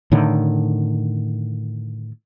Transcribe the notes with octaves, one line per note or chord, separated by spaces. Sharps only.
A2 D3 D#3